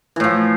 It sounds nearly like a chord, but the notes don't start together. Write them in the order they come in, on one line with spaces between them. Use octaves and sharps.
E3 A2 F3